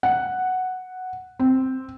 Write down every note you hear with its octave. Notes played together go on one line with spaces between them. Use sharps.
F#5
C4